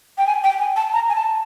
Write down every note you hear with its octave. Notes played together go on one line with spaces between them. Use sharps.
G5
G#5
G5
G#5
A5
A#5
G#5
A5